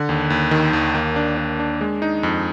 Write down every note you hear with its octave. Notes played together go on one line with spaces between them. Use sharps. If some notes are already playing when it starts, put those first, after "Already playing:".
Already playing: D3
D#2
D#2
D#3
D#2
A#3
D4
D4
D4
G#3
D#4
F2